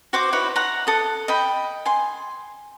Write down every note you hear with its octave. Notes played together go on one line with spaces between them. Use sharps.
F#4 C5 D6
D#4 E4 B4 C#5
F#5 A#5
A4 D#6
D#5 G5 B5
G#5 C6